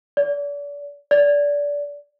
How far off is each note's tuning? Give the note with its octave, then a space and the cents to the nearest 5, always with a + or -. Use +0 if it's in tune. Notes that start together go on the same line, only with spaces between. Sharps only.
D5 -35
D5 -20